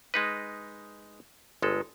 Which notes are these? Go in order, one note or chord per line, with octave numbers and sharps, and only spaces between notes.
G#3 D#4 B4
G1 G#3 A4